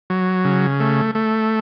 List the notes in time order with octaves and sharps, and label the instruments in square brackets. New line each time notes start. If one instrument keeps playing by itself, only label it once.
[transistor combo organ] F#3
C#3
A3
A3